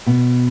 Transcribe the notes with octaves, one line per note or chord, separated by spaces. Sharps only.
B2